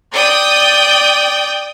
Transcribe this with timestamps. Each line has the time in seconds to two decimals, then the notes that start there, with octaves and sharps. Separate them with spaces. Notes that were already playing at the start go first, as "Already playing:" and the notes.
0.11 D5 G5 D#6